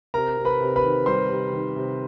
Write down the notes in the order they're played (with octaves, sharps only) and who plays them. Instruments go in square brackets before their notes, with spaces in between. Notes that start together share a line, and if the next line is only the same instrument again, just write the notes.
[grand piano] C3 A#4 A#5
C3
B4 B5
C3
B4 B5
D#3
G3 C5 C6
C3
D#3
C3